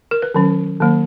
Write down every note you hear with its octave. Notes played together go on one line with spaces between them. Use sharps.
A#4
B4
D#3 F#3 C#4
D#3 F#3 A#3